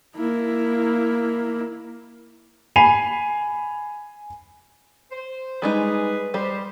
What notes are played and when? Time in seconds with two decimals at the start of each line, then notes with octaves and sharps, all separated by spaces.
0.16 A#3 E4
2.76 G#5 B5 C7 D#7 F7
5.11 C5
5.62 G3 G#3 D#4 G#4 B4
6.34 G3 G4 C5